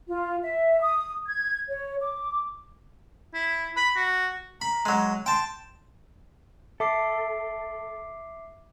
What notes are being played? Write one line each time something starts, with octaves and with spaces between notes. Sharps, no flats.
F4
E5
D#6
G#6
C#5
D6
E4
B5
F#4
A#5 B5
F#3 G#3
G5 A5 C6
A4 E5 D6 C7